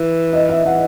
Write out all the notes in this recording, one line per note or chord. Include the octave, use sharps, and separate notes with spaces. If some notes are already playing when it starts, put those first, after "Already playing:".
Already playing: E3
D#5
E5
E3 F#5